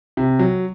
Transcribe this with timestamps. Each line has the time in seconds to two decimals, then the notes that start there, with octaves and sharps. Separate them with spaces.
0.17 C3
0.39 F#3